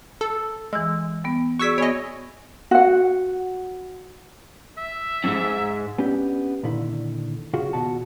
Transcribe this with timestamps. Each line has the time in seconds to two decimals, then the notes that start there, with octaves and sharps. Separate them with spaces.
0.21 A4
0.73 E3 G#3 E6
1.24 G3 B3
1.60 F#4 G#4 D5 C#6 E6 B6
1.78 B3 C#5 D#5 G#5
2.71 F#4 F#5
4.78 E5
5.24 F2 G#2
5.98 B3 C#4 D4 G4
6.63 A#2 D3 D#3 E4
7.53 C#3 F4 F#4 G#4
7.73 D#2 B2 F#4 A5